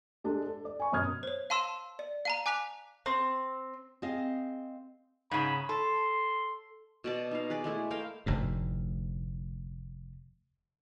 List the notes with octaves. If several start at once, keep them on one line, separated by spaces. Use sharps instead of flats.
G#3 D4 G4 A4
A4
D5
G#5 C#6
F#2 B2 D#6 F6 G#6
C5 C#5
F5 A5 C6 E6 E7
D5
F5 A5 A#5
G#5 D6 F#6 B6 F7
C4
C4 G#4 D#5 F5
G#2 C#3 B5
A4 C6
B2 D5 A5
D#4 B4 F5
G#4 B4 D5
G#3 A3 E4
A3 A#4 F5 G5
F1 D2 G#2